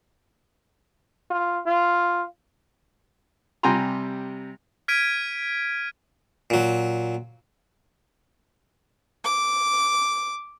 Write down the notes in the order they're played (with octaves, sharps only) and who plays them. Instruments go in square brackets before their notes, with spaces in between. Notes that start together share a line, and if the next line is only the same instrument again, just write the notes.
[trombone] F4
F4
[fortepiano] C3 G3 G5 G#5 A#5 C6
[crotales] F6 G#6 B6 D7 D#7
[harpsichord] A#2 F#3
[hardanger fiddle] D6